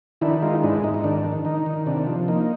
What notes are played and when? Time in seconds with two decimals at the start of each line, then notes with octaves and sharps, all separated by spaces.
0.21 D#3 D4 E4
0.42 G#3 D#4 F4
0.63 G#2 D4 E4
0.84 G#2 D#4
0.94 D#4
1.04 D#3 D4
1.24 D#3
1.45 D#3 D#4
1.66 D#3
1.86 C3 D4
2.07 F3
2.28 A#3 D#4